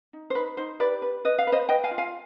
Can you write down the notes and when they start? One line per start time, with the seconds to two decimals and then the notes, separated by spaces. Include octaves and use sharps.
0.13 D#4
0.30 C5
0.35 D#4 B4
0.57 D#4 C5
0.80 G4 B4 D5
1.02 B4
1.25 B4 D#5
1.38 F5
1.47 B4
1.52 C5 D#5
1.69 B4 D#5 G5
1.84 F5 G#5
1.91 F4
1.98 F5 G#5